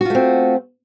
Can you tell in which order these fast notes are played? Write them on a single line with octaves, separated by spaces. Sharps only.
F#4 F4 A3 C4